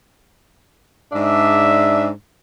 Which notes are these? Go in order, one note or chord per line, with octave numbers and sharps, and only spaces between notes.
G#2 D4 E5